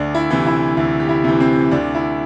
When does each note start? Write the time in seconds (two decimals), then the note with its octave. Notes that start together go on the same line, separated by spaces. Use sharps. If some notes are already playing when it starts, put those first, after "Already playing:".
Already playing: D2 D4
0.14 E4
0.30 C3 E3
0.46 E4
0.77 D2 E4
1.00 G4
1.09 E4
1.24 C3 E3
1.40 C4
1.71 D2 D4
1.95 E4